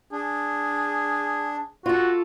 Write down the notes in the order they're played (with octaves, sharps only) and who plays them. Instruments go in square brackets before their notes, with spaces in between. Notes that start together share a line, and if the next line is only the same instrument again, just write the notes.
[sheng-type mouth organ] D4 [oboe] G#4
[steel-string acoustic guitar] F4 A4 [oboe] F#4